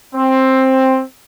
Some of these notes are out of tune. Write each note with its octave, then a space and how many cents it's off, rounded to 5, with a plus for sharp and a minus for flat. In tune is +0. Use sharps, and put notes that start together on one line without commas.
C4 +10